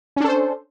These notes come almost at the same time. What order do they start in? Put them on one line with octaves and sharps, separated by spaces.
C#4 D4 A4 C5